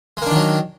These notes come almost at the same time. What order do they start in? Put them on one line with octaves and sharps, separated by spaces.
G#3 A#3 D4 D#3 F#3